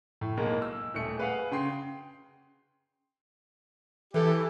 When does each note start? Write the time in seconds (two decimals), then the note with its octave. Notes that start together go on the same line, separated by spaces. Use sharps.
0.21 A2
0.37 B1 G#3 A#3
0.62 E6
0.94 D#1 A3 C#7
1.18 G#4 B4 F5 F#5
1.51 C#3 G5 C6 C7
4.14 E3 G4 A4